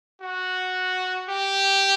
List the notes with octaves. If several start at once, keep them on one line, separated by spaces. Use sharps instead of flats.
F#4
G4